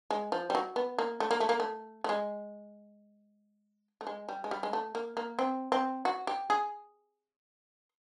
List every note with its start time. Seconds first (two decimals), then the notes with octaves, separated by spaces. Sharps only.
0.11 G#3
0.32 F3
0.50 G3
0.55 F#3
0.76 B3
0.99 A#3
1.20 A3
1.31 A#3
1.40 A3
1.49 A#3
1.60 A3
2.04 A3
2.09 G#3
4.01 A3
4.07 G#3
4.29 G3
4.44 G#3
4.51 G3
4.63 G#3
4.73 A3
4.95 A#3
5.17 A#3
5.39 C4
5.72 C4
6.05 F#4
6.27 G4
6.50 G#4